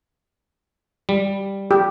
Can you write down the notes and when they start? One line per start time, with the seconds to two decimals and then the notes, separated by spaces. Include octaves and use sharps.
1.09 G3
1.71 G4